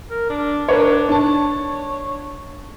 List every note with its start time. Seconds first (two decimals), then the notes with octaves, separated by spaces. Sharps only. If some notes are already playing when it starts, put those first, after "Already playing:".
0.10 A#4
0.30 D4
0.69 D4 A#4 B4 C#5
1.09 D4 C#5 A5